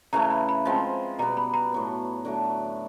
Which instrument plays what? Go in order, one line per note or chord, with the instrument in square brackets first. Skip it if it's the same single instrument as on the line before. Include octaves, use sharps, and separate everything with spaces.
[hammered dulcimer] C#3 E3 A3 [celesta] A#5
[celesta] B5
B5
[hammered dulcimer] F3 G#3 C4
[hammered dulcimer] B2 G3 B3 [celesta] A#5
[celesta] B5
A#5
[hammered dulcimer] A2 F#3 B3
D3 F#3 A3